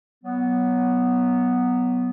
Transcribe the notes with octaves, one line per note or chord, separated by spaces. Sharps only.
F#3 B3